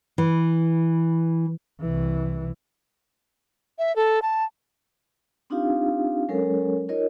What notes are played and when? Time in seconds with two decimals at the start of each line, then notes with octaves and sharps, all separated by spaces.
0.18 E3
1.81 C2 E3
3.79 E5
3.96 A4
4.22 A5
5.50 C4 D4 D#4 F4 G4 F5
6.29 F#3 G#3 C#4 A4 A#4 C#5
6.88 D#4 F4 A#4 C#5 D#5